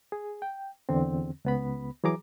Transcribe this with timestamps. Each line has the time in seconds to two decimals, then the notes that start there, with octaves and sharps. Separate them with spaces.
0.12 G#4
0.42 G5
0.89 E2 D3 C4
1.45 C#2 B3 B5
2.04 E3 F#3 G#4 A#5 D6